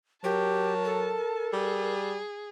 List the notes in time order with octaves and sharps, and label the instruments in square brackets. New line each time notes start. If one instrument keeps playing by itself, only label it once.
[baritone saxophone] F#3 [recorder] G4 [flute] A#4 [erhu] A5
[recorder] A4
[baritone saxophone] G3 [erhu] G#4